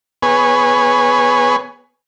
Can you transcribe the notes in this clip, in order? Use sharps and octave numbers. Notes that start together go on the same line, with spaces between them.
B3 G#4 B4 C#5 G#5